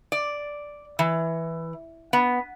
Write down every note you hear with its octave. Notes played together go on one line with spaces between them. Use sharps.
D5
E3
B3